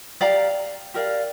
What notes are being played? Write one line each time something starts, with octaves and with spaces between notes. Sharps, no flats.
G4 D5 F5 A#5
G4 A#4 D5 F5